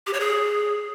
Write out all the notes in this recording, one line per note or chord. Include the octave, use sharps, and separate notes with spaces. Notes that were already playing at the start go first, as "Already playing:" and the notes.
G4
C#5
G#4